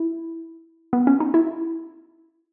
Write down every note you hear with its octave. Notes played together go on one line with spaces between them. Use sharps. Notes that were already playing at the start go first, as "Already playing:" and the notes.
Already playing: E4
B3
C#4
D#4
E4